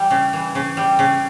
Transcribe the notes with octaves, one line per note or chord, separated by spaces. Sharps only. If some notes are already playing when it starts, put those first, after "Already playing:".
Already playing: E3 G3
C#3
E3
C#3
G3
C#3